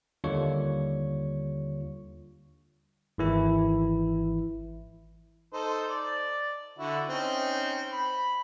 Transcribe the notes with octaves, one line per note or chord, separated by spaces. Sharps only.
D#2 D3 G3 F4 C#5 C#6
G#1 E3 E4
D#4 A4 C5
D5
D3 E4 F#4
C4 C#4 D#4
B5